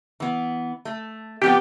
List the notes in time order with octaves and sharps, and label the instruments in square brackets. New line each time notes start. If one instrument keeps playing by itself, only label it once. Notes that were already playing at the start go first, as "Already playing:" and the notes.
[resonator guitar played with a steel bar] E3 B3
A3
[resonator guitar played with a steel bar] C3 F3 B3 [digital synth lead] G4